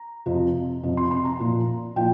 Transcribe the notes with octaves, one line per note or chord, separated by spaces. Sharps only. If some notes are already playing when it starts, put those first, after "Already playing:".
Already playing: A#5
F2 C3 F3
F2 C3 F3
C6
C6
A#5
A#2 F3
A#2 F3 G5